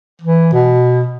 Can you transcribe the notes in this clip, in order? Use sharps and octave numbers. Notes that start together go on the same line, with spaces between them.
E3
B2